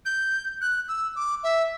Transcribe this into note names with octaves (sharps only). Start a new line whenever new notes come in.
G6
F#6
E6
D6
E5